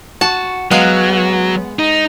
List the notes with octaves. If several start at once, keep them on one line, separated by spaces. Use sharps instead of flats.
F#4 A5
F#3 G#3 B3 F5
D#4